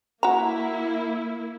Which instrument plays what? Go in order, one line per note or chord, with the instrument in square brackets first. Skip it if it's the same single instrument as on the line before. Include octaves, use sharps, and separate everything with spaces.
[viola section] A#3 E4 [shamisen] F#4 A#5